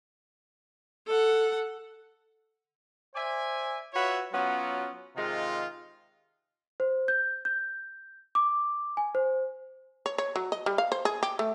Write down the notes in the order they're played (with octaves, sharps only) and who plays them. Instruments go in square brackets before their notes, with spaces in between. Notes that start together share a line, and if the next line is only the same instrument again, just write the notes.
[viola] A4 F#5
[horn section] C5 D5 E5 G#5
F4 F#4 B4 C#5 E5
F#3 B3 C#4 F4 F#4
C3 D#3 G#3 F4
[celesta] C5
G6
G6
D6
G#5
C5
[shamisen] C#5
C#5
F#3
D#5
G3
F5
C5
G#4
G4
A3